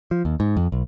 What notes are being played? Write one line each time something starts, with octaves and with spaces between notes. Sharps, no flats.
F3
D#2
G#2
F2
B1